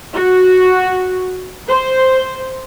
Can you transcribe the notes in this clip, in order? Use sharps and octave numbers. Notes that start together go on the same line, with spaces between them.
F#4
C5